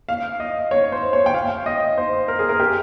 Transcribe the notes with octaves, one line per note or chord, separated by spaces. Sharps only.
F5
D#5
C#5
C5
C#5
G5
F5
D#5
C5
A#4
G#4
A#4
G4